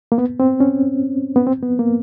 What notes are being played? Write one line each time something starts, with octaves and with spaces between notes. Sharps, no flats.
A#3
B3
C4
C#4
B3
C4
B3
A#3